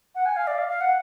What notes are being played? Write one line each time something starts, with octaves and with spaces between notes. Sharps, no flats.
F#5
G#5
F5
D5
F5
F5
F#5